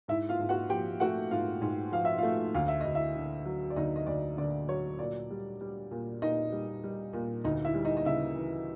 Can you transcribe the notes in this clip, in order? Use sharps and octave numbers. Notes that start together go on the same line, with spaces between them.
G#2 E4 E5
F4 F5
G#2
F#4 F#5
F3 G4 G5
A3 F#4 F#5
G#2 F4 F5
G#2
F3 F5
E5
A3 F4 F5
D2 F5
E5
D2 D#5
E4 E5
D3
F#3
D5
D2 D#4 D#5
D#5
D2 D5
D3 D5
F#3 C#5
A#2 D5
G3
G3
A#2
A#2 D#4 D#5
G3
G3
A#2
D2 D#4 D#5
E4 E5
G3
D#4 D#5
D#5
C#3 E4 E5
E3